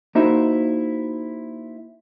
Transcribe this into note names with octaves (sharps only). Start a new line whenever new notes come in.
A#3 D#4 E4 F#4 C5 E5